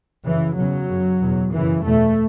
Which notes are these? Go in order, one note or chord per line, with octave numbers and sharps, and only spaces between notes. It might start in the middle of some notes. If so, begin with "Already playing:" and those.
F#2 C#3 E3
E2 C#3 F#3
F#2 C#3
E2 B2
F#2 C#3 E3
E2 B2 A3